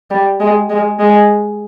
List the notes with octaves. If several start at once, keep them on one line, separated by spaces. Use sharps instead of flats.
G3
G#3
G#3
G#3